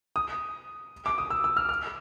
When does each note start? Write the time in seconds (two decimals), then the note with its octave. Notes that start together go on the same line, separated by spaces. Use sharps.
0.16 D#6
1.06 D6
1.18 D#6
1.30 E6
1.44 E6
1.57 F6
1.69 F6